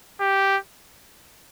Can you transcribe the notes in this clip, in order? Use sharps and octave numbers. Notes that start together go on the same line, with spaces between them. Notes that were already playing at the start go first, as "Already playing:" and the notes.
G4